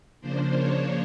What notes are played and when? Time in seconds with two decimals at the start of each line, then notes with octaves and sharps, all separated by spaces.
0.21 C#3 F3 A#3 D4 C5
0.55 C#5